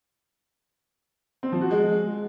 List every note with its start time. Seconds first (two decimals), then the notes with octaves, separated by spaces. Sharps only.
1.43 C4
1.52 F3
1.61 F#4
1.71 G#3